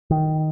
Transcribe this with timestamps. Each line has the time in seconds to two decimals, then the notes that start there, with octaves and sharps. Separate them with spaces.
0.11 D#3